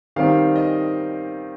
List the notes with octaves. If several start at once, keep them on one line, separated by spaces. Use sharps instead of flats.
D#3 G3 C4 F5
D#5